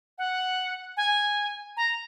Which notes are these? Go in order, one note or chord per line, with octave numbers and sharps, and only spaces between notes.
F#5
G#5
A#5